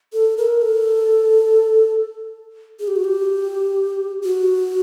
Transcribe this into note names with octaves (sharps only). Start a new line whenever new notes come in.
A4
A#4
A4
G#4
G4
F#4
G4
F#4